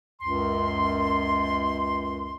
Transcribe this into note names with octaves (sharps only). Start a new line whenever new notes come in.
C#2 F#2 C6